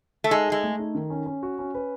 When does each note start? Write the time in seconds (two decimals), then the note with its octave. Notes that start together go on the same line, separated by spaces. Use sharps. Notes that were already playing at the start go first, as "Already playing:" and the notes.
0.24 A3
0.30 G#3 D#4
0.47 G#3 G#4
0.63 A3
0.79 D#4
0.95 D#3
1.10 C#4
1.26 C#4
1.43 F#4
1.59 C#4
1.75 B4